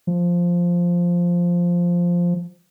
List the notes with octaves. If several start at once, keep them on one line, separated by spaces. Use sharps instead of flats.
F3